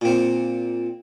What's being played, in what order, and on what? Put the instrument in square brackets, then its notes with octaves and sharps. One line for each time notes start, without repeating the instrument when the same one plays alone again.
[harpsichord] A#2 C4